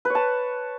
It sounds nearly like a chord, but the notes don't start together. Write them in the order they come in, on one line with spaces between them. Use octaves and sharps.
B4 C#5 A5